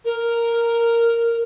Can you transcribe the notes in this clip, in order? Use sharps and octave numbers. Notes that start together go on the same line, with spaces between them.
A#4